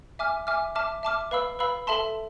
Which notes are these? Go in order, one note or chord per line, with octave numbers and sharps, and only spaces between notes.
E5 G#5 D6 F6
E5 G#5 D6 F6
E5 A5 D6 F6
E5 A5 D6 F6
B4 F5 B5 E6
B4 F5 B5 E6
A4 E5 A5 C6